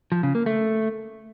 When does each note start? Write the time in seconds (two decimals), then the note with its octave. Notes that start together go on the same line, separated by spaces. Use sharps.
0.12 F3
0.23 C#3
0.35 A#3
0.46 A3